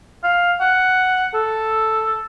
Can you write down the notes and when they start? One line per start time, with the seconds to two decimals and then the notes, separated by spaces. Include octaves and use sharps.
0.24 F5
0.60 F#5
1.34 A4